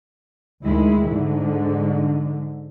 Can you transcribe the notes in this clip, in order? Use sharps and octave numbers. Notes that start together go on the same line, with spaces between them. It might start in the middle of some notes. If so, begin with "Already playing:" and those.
D2 D#3 G#3 E4
G#2 D3